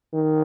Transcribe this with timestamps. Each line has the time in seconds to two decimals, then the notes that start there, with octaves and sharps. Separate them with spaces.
0.14 D#3